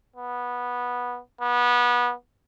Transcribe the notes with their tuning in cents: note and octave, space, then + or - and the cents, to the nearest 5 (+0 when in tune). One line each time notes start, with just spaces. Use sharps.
B3 -15
B3 -25